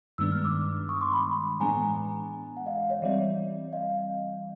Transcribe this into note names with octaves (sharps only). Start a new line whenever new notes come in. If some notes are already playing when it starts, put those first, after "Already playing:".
G2 D#3 G#3 B3 D4 E6
F6
D6 E6
C#6 D#6
C6 D6
B5 C#6
A2 E3 G#3 B3 D4 G#5 A#5
F#5
D#5 F5
C#5 D#5
E3 G3 C4 D5 E5
D#5 F5